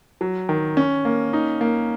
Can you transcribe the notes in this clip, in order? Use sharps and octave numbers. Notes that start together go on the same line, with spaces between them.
F#3
D#3
C#4
A#3
D#4
A#3